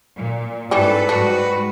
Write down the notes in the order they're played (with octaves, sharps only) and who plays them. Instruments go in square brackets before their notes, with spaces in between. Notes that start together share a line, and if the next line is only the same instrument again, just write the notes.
[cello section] A#2
[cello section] G#2 A4 [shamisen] E3 G3 C#4 [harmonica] B4
[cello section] G#2 G3 F#4 [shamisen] D4